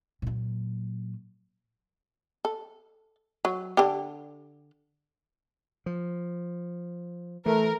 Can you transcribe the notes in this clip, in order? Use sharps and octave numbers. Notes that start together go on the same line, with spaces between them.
A#2 F#3
A4
F#3
D3 D4 G4
F3
E3 A3 A#4